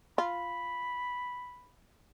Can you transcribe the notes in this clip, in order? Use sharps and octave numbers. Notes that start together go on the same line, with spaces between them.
F4 B5